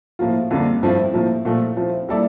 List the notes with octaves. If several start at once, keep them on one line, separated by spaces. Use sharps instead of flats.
A2 F3 A#3 F4
F2 D3 G3 A#3 D4
G2 F3 A3 C4 E4
A2 F3 A#3
A#2 F3 A3
F3 C4 E4
G3 A#3 E4 A4 D5